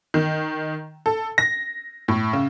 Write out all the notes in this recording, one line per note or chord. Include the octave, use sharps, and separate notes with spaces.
D#3
A4
A#6
A2
C#3